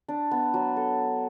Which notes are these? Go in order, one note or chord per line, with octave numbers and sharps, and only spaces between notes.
D4
B3
F#3
A4